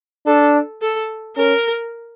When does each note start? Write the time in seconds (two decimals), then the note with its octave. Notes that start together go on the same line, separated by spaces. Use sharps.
0.26 D4 A4
0.82 A4
1.36 C#4 A#4